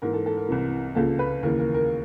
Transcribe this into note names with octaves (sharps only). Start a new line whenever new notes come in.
G#2 E3 A#4
A4
A4
A#4
C2 C3 E3
C#2 C#3 F3 A4
B4
D#2 C#3 E3 A#4
A#4
A#4